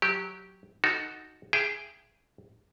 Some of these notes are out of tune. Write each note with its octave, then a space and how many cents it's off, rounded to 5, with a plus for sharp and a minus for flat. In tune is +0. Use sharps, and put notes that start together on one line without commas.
F#3 +0 G4 -10
D#4 +0 F#4 +0 A4 +0
G#4 +0 E5 +35 G5 +0